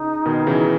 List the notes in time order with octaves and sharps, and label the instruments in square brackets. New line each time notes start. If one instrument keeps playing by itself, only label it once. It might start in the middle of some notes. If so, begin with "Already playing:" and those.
Already playing: [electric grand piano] C#3 [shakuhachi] D#4
[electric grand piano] B2 D#3
C#3 E3